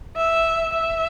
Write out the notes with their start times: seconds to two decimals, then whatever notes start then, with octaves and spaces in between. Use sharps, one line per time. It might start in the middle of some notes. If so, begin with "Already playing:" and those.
0.16 E5
0.73 E5